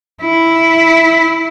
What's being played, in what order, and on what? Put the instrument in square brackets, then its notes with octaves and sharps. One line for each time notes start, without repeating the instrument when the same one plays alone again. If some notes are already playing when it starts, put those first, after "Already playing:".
[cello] E4